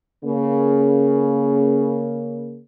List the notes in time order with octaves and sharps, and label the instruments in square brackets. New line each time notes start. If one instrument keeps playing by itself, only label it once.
[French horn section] C#3 A#3